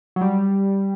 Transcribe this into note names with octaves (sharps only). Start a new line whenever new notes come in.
F#3
G3